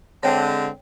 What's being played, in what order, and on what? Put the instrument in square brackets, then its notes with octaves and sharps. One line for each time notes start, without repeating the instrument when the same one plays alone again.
[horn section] D3 G#3 C4 [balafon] C#5 G5